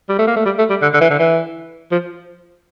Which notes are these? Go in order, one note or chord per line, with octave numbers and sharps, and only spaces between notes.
G3
A3
A#3
A3
G3
A3
G3
D3
D3
E3
D3
E3
F3